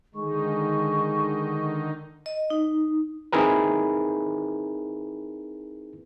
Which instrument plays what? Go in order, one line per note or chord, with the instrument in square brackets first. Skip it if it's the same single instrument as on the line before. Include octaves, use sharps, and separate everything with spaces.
[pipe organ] D3 D#3 D#4 [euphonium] G#3 [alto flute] C#6
[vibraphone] D#5
D#4
[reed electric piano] C4 D#4 E4 G#4 A#4 B4